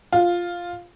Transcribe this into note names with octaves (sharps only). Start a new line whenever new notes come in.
F4